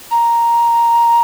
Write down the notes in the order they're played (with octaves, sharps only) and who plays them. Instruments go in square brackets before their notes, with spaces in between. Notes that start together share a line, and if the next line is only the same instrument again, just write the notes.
[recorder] A#5